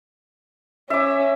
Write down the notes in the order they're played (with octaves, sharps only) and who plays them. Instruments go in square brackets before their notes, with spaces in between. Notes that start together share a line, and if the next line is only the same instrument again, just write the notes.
[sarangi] C#4 [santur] E5 D6